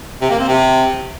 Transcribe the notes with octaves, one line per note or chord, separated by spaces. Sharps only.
C3
A#3
C4
C3